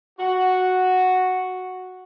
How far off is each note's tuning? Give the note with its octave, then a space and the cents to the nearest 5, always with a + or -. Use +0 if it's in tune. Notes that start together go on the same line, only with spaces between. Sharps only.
F#4 -5